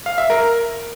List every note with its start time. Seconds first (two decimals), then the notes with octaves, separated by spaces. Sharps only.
0.06 F5
0.18 E5
0.30 A#4